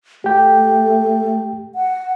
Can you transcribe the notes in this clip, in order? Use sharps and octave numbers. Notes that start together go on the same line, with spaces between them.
A3 G4 G5
F#5